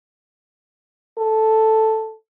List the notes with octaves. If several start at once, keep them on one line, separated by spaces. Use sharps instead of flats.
A4